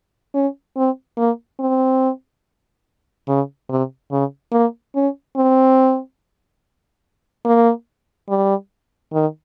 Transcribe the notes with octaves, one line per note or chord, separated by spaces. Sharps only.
C#4
C4
A#3
C4
C#3
C3
C#3
A#3
C#4
C4
A#3
G3
D#3